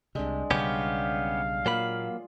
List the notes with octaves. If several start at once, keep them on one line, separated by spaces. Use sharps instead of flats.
C2 C3 G#3 D4
B1 C#3 G3 B3 C#4 G4 F5
A#2 F#3 A#3 F4 B5